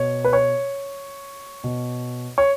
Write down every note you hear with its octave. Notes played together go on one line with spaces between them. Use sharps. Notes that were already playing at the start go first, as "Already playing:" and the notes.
Already playing: B2 C#5
B4
C#5
B2
C#5